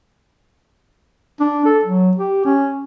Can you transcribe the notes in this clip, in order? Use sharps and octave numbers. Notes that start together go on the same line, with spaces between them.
D4
A4
F#3
G4
C#4